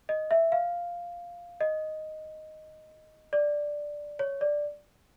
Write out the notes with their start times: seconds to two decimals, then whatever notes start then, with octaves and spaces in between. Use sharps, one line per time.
0.09 D#5
0.31 E5
0.52 F5
1.61 D#5
3.33 D5
4.19 C#5
4.41 D5